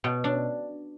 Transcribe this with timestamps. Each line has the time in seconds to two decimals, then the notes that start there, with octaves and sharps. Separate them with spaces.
0.04 B2
0.24 D4